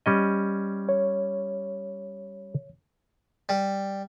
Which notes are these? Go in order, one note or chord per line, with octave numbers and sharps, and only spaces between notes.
G3 C#4 D#5
C#5
G3